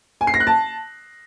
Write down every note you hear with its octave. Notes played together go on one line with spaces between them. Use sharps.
G#5
C7
A#6
F#6
A5